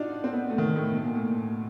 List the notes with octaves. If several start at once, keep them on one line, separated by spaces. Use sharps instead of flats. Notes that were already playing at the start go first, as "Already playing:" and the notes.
Already playing: D4 D#4 F4 F#4
C4
B3
A3
D#3
A2
B2
A#2
A2
A#2